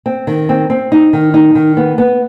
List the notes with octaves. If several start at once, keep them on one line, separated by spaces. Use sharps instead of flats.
C4
D#3
C4
C4
D#4
D#3
D#4
D#3
B3
B3